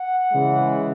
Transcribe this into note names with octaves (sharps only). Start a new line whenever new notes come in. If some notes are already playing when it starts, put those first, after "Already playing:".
Already playing: F#5
C#3 E3 G#3